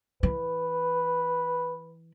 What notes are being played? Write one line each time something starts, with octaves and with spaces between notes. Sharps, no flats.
E3 B4